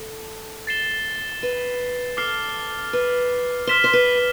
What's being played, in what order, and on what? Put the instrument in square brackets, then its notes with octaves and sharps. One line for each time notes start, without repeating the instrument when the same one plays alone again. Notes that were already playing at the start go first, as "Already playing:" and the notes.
Already playing: [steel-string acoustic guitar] A4
[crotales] A6 C7 E7 G7
[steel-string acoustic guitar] B4
[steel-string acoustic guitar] A4 [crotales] D6 F6 C7 G7
[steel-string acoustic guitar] B4
[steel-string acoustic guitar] C5 [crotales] F6 B6 E7 G7
[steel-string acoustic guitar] C5
B4